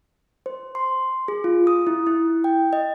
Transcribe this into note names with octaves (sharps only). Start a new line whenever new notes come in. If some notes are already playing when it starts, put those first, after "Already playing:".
C5
C6
G#4
F4
D#6
E4
E4
G5
D#5